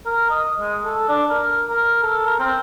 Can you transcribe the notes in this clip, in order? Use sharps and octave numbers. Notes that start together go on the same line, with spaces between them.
A#4
D#5
G#3
A4
D4
A#4
A#4
A4
A#4
C4